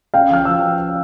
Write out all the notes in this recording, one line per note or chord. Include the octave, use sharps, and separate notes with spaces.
C#4 F5 G5
F3 F6
F3 E6